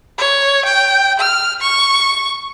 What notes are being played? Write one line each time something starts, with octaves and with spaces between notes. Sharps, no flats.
C#5
G5
F6
C#6